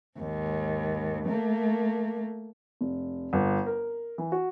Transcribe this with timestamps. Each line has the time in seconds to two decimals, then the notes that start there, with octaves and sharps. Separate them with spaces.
0.18 D#2 G#2
1.25 A3 A#3
2.81 F1
3.33 G1
3.66 A#4
4.18 E3
4.32 F#4